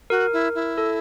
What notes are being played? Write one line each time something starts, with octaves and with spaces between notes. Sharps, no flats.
F#4 A#4
E4
E4
A4